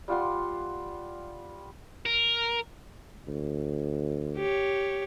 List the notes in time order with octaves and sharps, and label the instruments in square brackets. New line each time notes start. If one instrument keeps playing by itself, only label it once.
[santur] G3 F4 F#5 C6
[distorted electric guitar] A#4
[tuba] D2
[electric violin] G4 C#5